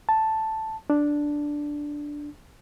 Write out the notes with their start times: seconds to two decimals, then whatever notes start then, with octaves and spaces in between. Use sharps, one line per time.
0.09 A5
0.90 D4